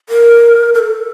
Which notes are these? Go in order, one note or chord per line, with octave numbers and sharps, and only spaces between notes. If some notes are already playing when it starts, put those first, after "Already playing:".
A#4
A#4
A4